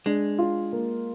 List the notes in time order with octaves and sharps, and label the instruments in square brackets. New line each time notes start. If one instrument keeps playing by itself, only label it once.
[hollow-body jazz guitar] G#3 [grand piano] D4
[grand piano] F4
A#3